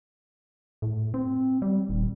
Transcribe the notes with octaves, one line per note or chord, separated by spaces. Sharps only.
A2
C4
G3
D#1